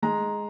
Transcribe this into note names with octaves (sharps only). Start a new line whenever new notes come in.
G#3 A#5